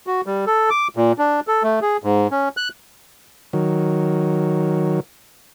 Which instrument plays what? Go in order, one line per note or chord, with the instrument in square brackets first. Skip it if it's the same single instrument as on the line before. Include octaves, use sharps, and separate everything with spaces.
[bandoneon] F#4
G3
A4
D6
A#2
D4
A4
A3
G#4
G#2
C#4
F#6
[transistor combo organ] D#3 F#3